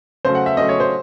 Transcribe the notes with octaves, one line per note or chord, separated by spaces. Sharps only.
C#3 F#3 A3 C5
F#5
E5
C#3 F#3 A3 D#5
C#5
C5